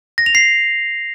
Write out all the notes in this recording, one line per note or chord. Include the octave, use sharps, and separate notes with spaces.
A#6
F7
C7